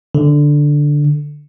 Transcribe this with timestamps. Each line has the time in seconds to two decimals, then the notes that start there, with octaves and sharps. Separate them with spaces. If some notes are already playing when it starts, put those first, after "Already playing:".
0.15 D3